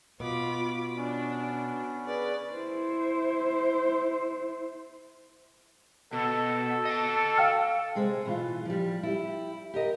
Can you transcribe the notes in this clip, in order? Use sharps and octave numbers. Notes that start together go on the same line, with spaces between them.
B2 F4 B5 D6
B3 C#4 D4
G#4 B4 D5
E4 C5
B2 A4
D#5 A5
F5 G5 F6
C3 G#3 G#4 C5
B2 E3 F4
F3 G3
E4 G4
G4 A#4 D#5